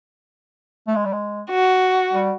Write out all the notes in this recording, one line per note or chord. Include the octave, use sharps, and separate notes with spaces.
A3
G#3
G3
G#3
F#4
G3